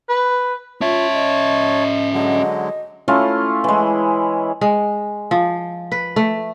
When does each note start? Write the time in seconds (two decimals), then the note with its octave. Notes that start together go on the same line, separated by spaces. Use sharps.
0.09 B4
0.81 C#4 F4 C#5 E5 A5
1.13 D#5
2.14 D3 F#3 G#3 D#5
3.08 A3 C#4 E4 F4
3.64 E3 G#3
4.61 G#3
5.31 F3
5.92 B4
6.16 A3